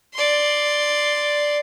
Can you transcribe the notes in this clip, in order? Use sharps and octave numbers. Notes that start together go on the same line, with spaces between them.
D5 C6